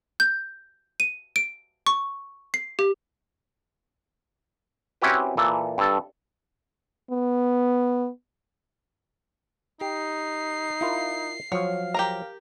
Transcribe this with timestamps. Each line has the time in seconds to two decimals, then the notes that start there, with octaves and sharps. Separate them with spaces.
0.20 G6
1.00 D#7
1.36 D7
1.87 C#6
2.54 C7
2.79 G4
5.02 C4 C#4 E4 F#4 G4 B4
5.37 A#2 E3 A4
5.78 G2 A4
7.10 B3
9.81 D#4 G4 C7
10.81 E4 F4 A#4
11.52 F3 F#3 C#5 F5
11.94 G4 A#4 A#5